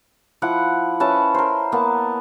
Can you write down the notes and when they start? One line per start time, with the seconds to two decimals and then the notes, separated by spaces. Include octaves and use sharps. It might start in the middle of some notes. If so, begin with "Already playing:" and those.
0.42 F3 E4 F#5 D6
1.00 C#4 B4 E5 A5
1.34 A#4 C5
1.72 A#3 B3 A5